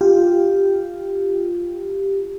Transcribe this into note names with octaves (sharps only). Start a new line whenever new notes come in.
F4 G4